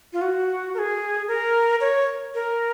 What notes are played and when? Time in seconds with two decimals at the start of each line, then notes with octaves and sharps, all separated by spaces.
0.13 F4
0.21 F#4
0.74 A#4
0.78 G#4
1.28 A#4
1.81 C#5
2.35 A#4